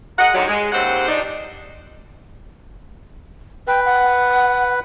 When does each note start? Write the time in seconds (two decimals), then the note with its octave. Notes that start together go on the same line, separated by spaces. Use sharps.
0.19 G#3 A#4 D#5 F#5
0.34 G#2 D3 D#3 F#3
0.48 G#3
0.72 D#2 C#3 C4 G4 C5 F#5
1.09 F3 D4 D#4
3.68 B4 G5
3.86 F#5